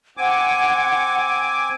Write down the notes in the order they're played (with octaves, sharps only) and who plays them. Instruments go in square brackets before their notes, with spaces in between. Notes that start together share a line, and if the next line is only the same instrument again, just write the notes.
[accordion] C4 G#5 D6 [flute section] F#5